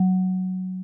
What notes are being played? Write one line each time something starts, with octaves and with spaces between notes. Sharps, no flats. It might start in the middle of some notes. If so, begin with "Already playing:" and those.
Already playing: F#3